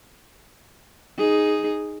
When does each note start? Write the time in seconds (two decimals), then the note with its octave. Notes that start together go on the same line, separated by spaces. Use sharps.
1.18 D#4 G#4